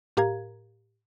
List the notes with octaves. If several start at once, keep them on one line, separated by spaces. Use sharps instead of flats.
A2 G4 A#4 F5 A#5 G#6